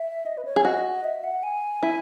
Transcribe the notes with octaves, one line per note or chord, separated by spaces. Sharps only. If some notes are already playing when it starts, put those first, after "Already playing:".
Already playing: E5
D#5
B4
C#5
G#4
F#4 D#5
E5
F#5
G#5
E4